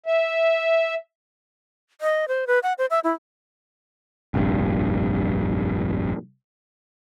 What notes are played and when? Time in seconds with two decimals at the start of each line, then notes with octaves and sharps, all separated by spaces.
0.06 E5
2.01 D#5
2.28 C5
2.47 B4
2.63 F#5
2.78 C5
2.90 E5
3.04 E4
4.34 F1 A#1 G2